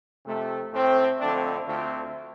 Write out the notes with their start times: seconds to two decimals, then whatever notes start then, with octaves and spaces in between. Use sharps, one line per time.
0.25 F2 C3 A3
0.72 A2 A3 C4
1.19 F2 D3 A3 C4 D4
1.66 D2 D3 A3 C4 F4